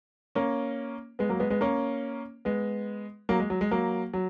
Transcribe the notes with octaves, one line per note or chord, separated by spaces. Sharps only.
A#3 C#4
G#3 B3
F#3 A#3
G#3 B3
G#3 B3
A#3 C#4
G#3 B3
F#3 A#3
G#3
F#3
G#3
F#3 A#3
F#3